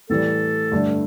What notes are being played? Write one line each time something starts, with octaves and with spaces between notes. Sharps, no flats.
A2 E3 G3 A4
G2 D3 A3 D4